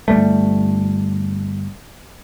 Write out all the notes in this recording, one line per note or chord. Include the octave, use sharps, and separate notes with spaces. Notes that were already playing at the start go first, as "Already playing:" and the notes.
G1 G2 G3 A3